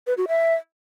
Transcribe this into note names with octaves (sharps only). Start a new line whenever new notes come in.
B4
F#4
E5